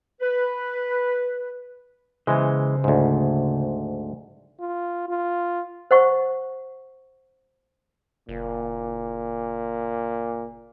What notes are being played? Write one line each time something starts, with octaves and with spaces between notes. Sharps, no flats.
B4
C#3 E3 G#3 C5
D2 G#2
F4
F4
C5 F#5 C#6
F#1 A#2